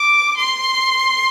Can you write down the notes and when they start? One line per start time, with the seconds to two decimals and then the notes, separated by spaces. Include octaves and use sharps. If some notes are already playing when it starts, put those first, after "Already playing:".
Already playing: D6
0.37 C6